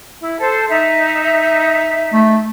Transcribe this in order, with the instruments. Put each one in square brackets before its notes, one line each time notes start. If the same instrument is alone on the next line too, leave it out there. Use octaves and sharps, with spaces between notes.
[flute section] E4
A4 C5
D#4 E5
[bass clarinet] A3